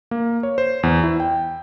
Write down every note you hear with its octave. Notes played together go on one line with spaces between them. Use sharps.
A#3
C#5
C5
E2
E4
G5